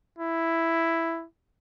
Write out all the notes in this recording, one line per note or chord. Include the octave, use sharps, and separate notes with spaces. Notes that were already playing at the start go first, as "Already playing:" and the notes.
E4